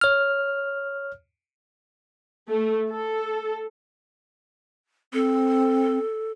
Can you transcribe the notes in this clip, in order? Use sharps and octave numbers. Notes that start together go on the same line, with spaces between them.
C#5 F6
A3
A4
C4 A4